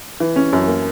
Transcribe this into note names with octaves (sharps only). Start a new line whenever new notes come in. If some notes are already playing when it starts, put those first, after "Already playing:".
E3
C#4
F#2
A#3